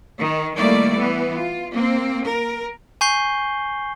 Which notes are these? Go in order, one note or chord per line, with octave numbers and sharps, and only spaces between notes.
D#3
D#3 G3 A3 A#3 E4 D5
E3 B3
F4
A#3 C4
A#4
G#5 C#6 G6 C7 G7